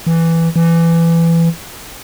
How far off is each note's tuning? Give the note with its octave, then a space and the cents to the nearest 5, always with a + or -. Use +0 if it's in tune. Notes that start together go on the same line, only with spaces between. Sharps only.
E3 +5
E3 +20